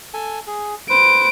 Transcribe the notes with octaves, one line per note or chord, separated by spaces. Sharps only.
A4 G#5
G#4
B4 C5 D7